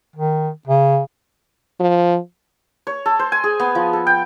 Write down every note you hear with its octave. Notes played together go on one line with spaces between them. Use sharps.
D#3
C#3
F3
C#5
A4
C5
G#5
G#4
B3
F3
A4
G5